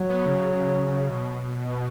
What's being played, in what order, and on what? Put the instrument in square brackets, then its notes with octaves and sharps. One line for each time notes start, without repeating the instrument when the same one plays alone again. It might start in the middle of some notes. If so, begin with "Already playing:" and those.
Already playing: [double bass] F#3
[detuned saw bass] B3
C#3
B2